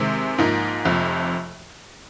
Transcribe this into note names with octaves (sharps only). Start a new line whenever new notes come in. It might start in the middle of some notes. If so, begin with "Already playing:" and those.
Already playing: C3 D#3 G#3 C4
G#2 F3 A#3 D#4
F1 F2 C3 F3